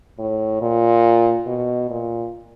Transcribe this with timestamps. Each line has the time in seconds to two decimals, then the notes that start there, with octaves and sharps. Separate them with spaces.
0.19 A2
0.62 A#2
1.47 B2
1.90 A#2